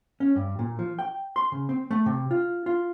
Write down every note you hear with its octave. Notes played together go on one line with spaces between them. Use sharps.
C#4
G2
A#2
F3
G5
C6
C#3
C4
A3
C3
F4
F4